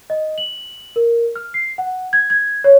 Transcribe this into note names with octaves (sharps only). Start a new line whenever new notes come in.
D#5
F#7
A#4
F6
C7
F#5
G#6
G#6
C#5